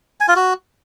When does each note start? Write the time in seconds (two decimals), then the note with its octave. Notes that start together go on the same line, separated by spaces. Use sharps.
0.20 G#5
0.28 F4
0.36 F#4